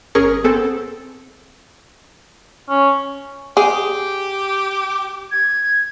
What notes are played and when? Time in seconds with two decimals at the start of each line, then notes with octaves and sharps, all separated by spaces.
0.15 G1 C#4 G#4 A#4 C#6
0.44 B3 C4 G#4 A4
2.69 C#4
3.57 G4 G#4
5.31 G#6